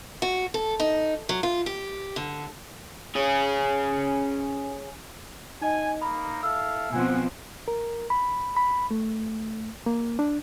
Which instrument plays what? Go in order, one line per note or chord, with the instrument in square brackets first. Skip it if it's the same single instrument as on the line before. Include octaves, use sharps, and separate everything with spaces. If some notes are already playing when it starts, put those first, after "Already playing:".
[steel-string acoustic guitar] F#4
A4
D#4
F#3
F4
G4
D3
[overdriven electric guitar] C#4 G#4
[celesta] D#4 D#5 [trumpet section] G#5
[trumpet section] A#3 D#4 [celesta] B5
[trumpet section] E4 A4 F5 [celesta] E6
[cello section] B2 F3 C4 [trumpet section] F#5 G#5
[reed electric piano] A#4
B5
B5
A3
A#3
D4